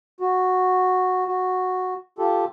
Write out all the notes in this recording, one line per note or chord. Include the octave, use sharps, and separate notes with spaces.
F#4
F#4
F4 G4 A4